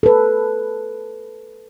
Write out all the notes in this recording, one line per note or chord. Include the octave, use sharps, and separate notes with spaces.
A4 B4